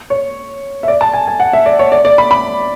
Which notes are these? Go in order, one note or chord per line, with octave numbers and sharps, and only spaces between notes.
C#5
E5
D5
A5
G#5
G#5
F#5
E5
D5
C#5
D5
D5
B5
B5